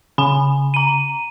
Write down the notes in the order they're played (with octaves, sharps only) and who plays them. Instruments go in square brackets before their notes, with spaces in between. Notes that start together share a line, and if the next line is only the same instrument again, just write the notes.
[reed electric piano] C#3 [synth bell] G#5 B5
[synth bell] A#5 D#7